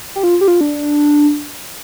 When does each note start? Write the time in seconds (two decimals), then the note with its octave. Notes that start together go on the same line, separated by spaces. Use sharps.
0.16 G4
0.23 F4
0.41 G4
0.48 F4
0.61 D4